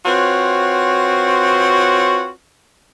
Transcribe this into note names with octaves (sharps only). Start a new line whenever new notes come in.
C4 F4 F#4 B4 C#5